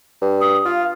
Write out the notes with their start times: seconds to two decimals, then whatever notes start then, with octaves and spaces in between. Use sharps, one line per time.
0.22 G2
0.41 D#6
0.65 F4 F5